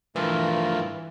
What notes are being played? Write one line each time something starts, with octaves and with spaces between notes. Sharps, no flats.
G2 E3 F3 A3 F4 A#4